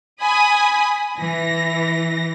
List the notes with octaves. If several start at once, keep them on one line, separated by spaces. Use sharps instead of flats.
G#5 B5 D#6
E3 A#6